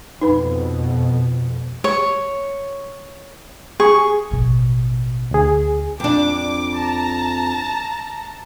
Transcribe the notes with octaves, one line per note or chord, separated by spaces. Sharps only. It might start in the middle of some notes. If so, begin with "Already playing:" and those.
F2 B2 D#4 B4 B5
C#5
G#4 C#6
A1 B2
D2 G#4
F2 D4 D6
A5 A#5